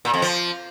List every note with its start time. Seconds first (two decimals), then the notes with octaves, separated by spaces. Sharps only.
0.05 A#2
0.14 F2
0.22 F3